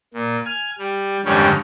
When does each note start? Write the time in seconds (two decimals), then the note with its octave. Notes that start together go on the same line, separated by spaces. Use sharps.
0.14 A#2
0.46 G#5 F6
0.79 G3
1.25 F2 G#2 D3 D#3 G3 C#4